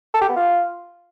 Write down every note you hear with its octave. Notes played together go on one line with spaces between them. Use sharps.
A4
G4
B3
F4